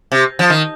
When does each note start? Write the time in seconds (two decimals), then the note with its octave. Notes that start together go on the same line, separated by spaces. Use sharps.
0.12 C3
0.39 F3
0.50 D#3